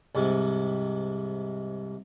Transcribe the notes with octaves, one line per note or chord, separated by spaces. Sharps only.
C2 G#2 C3